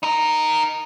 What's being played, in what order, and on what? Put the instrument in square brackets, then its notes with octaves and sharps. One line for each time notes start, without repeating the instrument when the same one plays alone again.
[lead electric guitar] D#4 A#4